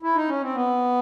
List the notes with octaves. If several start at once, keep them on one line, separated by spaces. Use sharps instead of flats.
E4
D#4
C#4
C4
B3